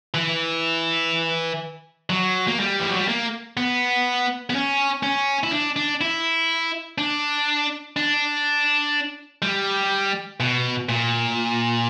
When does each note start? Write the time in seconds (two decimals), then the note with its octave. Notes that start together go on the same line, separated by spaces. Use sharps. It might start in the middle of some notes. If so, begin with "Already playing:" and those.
0.14 E3
2.10 F#3
2.47 A#3
2.60 G3
2.80 E3
2.89 F#3
2.98 G3
3.08 A#3
3.57 B3
4.50 B3
4.55 C#4
5.03 C#4
5.43 E4
5.52 D4
5.76 D4
6.01 E4
6.98 D4
7.97 D4
9.42 G3
10.40 B2
10.89 A#2